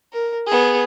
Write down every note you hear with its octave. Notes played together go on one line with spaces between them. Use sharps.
A#4
B3 G#4